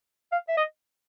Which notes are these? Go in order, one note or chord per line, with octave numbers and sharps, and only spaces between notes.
F5
E5
D#5